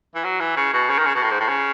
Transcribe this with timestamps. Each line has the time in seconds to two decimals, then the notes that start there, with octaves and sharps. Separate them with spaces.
0.15 E3
0.24 F#3
0.40 E3
0.57 C#3
0.74 B2
0.90 C#3
0.98 D#3
1.06 C#3
1.15 B2
1.23 A2
1.31 G#2
1.40 A2
1.49 C#3